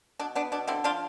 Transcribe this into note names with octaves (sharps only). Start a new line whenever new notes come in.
B2 D4
B3 D4
B2 D4
D3 C4 E4
F3 D4 F4